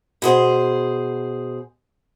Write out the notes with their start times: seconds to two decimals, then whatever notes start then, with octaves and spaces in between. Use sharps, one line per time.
0.22 B2 G#4 C5